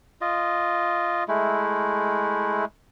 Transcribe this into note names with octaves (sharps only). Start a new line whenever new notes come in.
F4 D#5
G#3 A3 E4